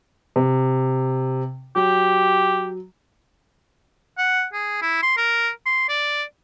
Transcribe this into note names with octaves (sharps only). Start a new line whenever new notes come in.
C3
F#3 G4
F#5
G#4
E4
C6
A#4
C6
D5